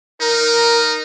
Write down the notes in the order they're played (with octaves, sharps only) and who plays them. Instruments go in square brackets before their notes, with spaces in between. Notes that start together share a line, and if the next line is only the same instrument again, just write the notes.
[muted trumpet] D#4 [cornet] A#4